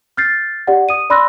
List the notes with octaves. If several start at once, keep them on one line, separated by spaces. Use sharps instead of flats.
F6 G6 A6 C7
G4 D5 F#5
D#6 D#7
D5 B5 C6 E6 F#6 A#6